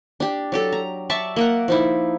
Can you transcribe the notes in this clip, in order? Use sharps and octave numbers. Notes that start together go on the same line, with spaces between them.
D4 G4
F#3 G4 A4
A#5
D5 E5 A5 C#6
A#3 A#4 F#5
F3 D#4 E4